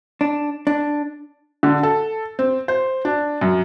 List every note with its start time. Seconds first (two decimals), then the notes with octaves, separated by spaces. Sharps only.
0.21 D4
0.67 D4
1.63 D3
1.83 A4
2.39 C4
2.68 C5
3.05 D4
3.41 F#2